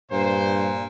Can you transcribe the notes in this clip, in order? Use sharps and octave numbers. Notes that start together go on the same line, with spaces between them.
G2 A#2 C5